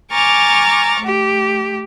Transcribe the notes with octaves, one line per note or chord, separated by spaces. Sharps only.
G#5 A#5 C#6 D6 F6 A6
A3 G4